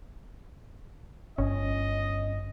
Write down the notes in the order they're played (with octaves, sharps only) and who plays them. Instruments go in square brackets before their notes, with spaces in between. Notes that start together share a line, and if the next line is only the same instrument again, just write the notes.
[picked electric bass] G1 [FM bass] C#4 [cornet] D#5